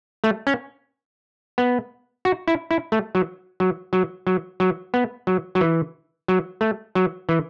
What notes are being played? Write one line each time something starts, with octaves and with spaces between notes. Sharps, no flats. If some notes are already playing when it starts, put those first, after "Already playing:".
A3
C#4
B3
F#4
E4
E4
A3
F#3
F#3
F#3
F#3
F#3
B3
F#3
F#3
E3
F#3
A3
F#3
E3